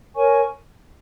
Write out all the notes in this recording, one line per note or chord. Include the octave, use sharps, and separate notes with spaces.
A#4 C#5 G#5 C#6